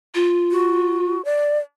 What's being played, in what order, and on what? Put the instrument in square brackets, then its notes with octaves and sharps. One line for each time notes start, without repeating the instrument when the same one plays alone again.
[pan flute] F4
[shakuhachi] F#4
D5